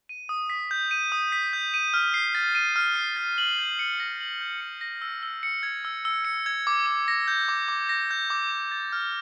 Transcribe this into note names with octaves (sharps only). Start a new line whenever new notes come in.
D#7
D#6
B6
G6
D#7
D#6
B6
G6
D#7
F6
C7
A6
D#7
F6
C7
A6
F#7
G6
C#7
A#6
F#7
G6
C#7
A#6
E6
E6
C#7
G#6
E6
E6
C#7
G#6
D6
D6
A#6
G6
D6
D6
A#6
G6
D6
D6
A6
F6